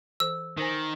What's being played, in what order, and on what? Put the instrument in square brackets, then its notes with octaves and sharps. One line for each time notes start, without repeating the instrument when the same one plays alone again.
[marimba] E3 A4 C5 [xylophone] E6
[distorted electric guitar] D#3 [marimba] A#4 C5 G#5